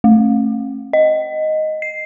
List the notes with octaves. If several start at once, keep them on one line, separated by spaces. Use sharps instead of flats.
A3
D#5
C7